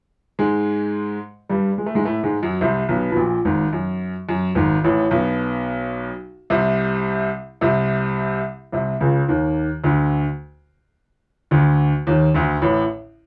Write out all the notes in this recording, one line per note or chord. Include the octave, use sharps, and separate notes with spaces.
G#2 G#3
G2 G3
G#3
A3
G#2 G#3
A2 A3
G#2 G#3
F#2 F#3
C2 C3
B1 B2
B2
A#1 A#2
G#1 G#2
F#2
F#2
G#1 G#2
A1 A2
B1 B2
C2 C3
C2 C3
C2 C3
C#2 C#3
D#2 D#3
D2 D3
D2 D3
D#2 D#3
D2 D3
A1 A2